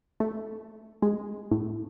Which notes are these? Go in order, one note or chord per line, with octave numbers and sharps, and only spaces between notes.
A3
G#3
A2